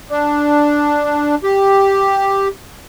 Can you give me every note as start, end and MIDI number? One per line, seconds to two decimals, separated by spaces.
0.10 1.35 62
1.43 2.48 67